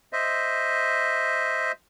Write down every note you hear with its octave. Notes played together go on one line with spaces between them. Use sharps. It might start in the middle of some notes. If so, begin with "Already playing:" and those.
C5 D#5 E5